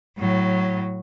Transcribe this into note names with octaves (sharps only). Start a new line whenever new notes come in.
A2 F#3